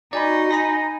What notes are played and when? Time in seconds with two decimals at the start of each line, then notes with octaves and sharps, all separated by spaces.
0.13 D#4 F#4 D5 G#5 B5
0.51 G#5 A#5 B5 A#6